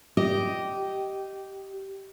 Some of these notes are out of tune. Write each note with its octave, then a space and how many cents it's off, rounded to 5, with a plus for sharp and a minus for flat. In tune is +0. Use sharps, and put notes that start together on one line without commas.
G4 -15 D#5 +0